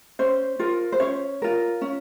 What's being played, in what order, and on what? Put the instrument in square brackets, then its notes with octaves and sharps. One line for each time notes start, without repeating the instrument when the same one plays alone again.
[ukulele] C#4 C5
F4 A#4
C5
C#4 C#5
F4 A#4
C#4